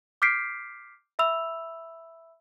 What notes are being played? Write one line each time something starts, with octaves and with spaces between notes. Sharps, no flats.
D6 F6 G6 B6 C7 D7
E5 B5 E6 F7